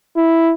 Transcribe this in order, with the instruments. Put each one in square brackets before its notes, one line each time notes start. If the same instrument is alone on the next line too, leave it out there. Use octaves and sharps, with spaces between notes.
[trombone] E4